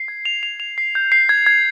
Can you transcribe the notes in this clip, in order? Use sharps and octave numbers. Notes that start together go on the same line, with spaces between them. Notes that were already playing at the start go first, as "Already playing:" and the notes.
Already playing: C7
G#6
F7
F7
F7
C7
G6
C7
G#6
G#6